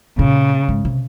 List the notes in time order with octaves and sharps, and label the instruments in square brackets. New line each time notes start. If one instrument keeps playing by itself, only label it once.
[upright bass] A#2 [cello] C#3
[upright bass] G#2
C3